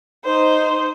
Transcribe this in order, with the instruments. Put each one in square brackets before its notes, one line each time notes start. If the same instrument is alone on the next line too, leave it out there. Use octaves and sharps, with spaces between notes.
[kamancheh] D#4 C5